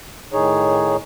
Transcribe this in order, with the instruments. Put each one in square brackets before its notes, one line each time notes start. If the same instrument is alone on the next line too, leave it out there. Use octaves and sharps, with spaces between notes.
[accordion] A2 D#3 D#4 G#4 C#5